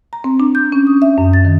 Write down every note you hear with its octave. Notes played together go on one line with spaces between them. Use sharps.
A#5
C4
D4
G6
C#4
D#6
E5
F#2
A6
D#3